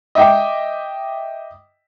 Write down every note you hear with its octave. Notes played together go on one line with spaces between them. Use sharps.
D#5 E5 G5 D6